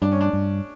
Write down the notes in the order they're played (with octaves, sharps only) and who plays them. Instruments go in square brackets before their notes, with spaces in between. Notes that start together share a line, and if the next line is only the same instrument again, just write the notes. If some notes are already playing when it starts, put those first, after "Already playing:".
[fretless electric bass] G2 [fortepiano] D4
[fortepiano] C#4
D4
[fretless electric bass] G2